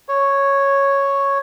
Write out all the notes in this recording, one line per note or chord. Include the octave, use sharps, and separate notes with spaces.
C#5